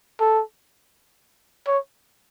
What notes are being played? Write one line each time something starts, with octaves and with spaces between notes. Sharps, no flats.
A4
C#5